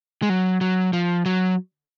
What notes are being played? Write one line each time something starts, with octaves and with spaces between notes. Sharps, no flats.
G#3
F#3
F#3
F3
F#3